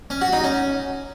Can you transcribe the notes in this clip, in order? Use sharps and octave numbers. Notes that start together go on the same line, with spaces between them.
C#4
F#4
D#4
C#4